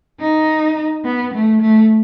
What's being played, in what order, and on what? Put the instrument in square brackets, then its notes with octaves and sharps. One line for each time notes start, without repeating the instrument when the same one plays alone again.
[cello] D#4
B3
A3
A3